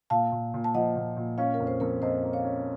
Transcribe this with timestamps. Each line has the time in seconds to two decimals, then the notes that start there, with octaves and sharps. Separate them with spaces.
0.10 A#2 F5 A5
0.32 A#2
0.54 A#2
0.64 A5
0.75 F3 D#5 F#5
0.96 A#2
1.17 A#2
1.38 C#4 C#5 F5
1.54 A#4
1.60 F2
1.67 C5
1.80 F2 A#4 C#5
2.02 F2 C5 D#5
2.23 A#3
2.33 C#5 F5
2.44 C#4